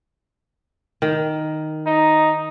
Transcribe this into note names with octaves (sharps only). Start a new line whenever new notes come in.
D#3
D#4